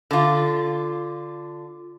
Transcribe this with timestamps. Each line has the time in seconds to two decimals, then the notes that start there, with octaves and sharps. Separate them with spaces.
0.11 D3 F4